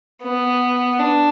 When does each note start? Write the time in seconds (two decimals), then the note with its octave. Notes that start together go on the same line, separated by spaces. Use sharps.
0.23 B3
0.99 D4